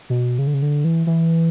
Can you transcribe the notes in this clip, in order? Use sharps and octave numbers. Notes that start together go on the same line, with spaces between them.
B2
C#3
D3
C#3
D3
E3
E3